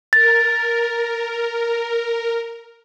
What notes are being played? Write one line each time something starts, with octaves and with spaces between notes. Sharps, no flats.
A#4 A6